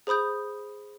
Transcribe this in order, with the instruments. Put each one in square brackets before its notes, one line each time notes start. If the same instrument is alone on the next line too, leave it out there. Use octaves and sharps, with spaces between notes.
[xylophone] G#4 C5 B5 D#6 G6